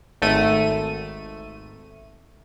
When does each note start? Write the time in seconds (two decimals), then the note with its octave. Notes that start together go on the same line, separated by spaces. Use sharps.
0.22 G#1 A3 D#7